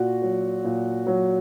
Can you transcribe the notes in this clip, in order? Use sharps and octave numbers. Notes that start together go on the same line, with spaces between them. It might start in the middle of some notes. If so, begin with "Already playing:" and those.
Already playing: A#2 F#4
F#3
A#2
F#3